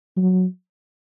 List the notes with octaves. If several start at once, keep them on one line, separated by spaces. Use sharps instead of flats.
F#3